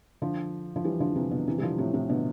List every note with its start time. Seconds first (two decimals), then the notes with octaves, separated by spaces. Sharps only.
0.22 D3 F3
0.76 F3
0.84 E3 G3
1.00 D3 F3
1.15 C3 E3
1.31 B2 D3
1.47 C3 E3
1.58 G3
1.63 D3 F3
1.78 A2 C3
1.93 A2 C3
2.09 B2 D3